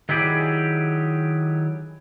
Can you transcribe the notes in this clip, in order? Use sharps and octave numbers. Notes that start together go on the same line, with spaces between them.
D#3 F#3 E4 G4 G#4 D5